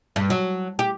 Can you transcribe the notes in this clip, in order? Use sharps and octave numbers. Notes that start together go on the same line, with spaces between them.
G2
F#3
G4